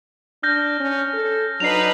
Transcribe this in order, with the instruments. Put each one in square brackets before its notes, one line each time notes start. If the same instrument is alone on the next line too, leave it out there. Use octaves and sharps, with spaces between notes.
[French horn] D4 [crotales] F6 G6 A#6
[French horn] C#4
A4
[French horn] F#3 [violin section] D4 D#4 B4 [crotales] C7 F7